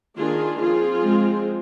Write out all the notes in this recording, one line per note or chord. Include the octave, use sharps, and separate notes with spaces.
D#3 A#3 D4 F4 G#4
F3 C4 F4 G#4
F3 G#3 C4